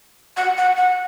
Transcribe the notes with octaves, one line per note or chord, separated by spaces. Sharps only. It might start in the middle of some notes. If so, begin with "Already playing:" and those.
F#5
F#5
F#5